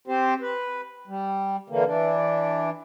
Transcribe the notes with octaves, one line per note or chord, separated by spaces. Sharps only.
C4 G4 C5
B4
G3
D3 E3 A#3
E3 D4